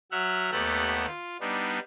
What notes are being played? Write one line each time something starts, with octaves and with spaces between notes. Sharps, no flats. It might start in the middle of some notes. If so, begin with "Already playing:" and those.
F#3 E5 F#5 F6
D#2 A3 B3 G4 A4 F#5
F4
G3 B3 D4 D#4